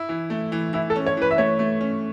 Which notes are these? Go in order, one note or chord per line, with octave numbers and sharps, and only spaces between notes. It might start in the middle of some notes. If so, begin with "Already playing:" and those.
Already playing: E4
E3
A3
E3
E3 E4
A4
C#4
C#5
E3 B4
E5
A3 C#5
A3
C#4